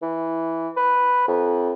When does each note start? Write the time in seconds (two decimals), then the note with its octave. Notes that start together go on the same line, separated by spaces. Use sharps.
0.02 E3
0.77 B4
1.28 F2